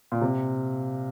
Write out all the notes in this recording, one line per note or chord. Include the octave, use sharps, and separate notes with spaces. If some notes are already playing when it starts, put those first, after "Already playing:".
A#2
C3